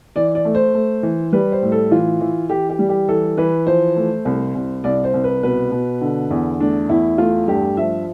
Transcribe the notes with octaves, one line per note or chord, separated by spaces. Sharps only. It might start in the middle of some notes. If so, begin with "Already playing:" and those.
E3 D5
D5
A3
C5
A3
E3
G3 B4
C5
A2
A4
E3 F4
E3
E3 G4
G4
G3
G4
E3 A4
E3 B4
F3 C5
A3
C2
C2
C2 D5
C5
C2
B4
B2 B4
B2
D3
E2
A3 D4
E2 E4
A3 F4
G2 G4
F3 E5